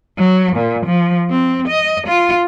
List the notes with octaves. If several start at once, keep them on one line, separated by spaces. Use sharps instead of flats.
F#3
A#2
F3
C4
D#5
F4